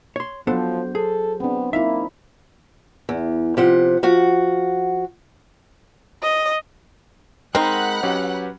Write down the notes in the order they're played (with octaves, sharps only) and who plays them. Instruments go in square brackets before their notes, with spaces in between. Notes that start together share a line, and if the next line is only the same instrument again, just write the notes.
[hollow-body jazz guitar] C#5 C6
[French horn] F3 [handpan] F#3 C5 [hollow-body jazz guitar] B3 D4 A4
[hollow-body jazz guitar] G#4 [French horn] A4
[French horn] B3 [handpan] C4 D4
[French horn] A#3 [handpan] D#4 E4 [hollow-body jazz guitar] E5 F5
[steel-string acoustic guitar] E2
C3 F3 F#5
F3 F#4 F#5
[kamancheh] D#5
[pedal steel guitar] G#3 A#4 C6 [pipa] C4 D#4 [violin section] F#5 B5 F#6
[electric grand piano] F#3 C#4 G4 [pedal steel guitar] B4